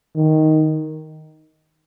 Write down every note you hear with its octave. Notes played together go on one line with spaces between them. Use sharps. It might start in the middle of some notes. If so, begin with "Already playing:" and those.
D#3